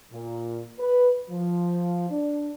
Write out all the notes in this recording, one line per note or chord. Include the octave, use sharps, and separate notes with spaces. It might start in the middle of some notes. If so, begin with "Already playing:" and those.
A#2
B4
F3
D4